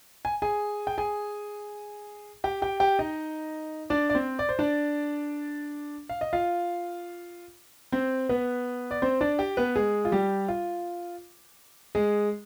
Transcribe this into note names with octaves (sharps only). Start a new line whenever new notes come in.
G#5
G#4 G#5
G5
G#4 G#5
G4 G5
G4 G5
G4 G5
D#4 D#5
D4 D5
D5
C4 C5
D5
C5
D4 D5
F5
D#5
F4 F5
C4 C5
B3 B4
D5
C4 C5
D4 D5
G4 G5
B3 B4
G#3 G#4
F4
G3 G4
F4
G#3 G#4